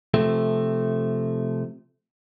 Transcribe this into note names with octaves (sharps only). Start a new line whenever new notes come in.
C3 F3 A3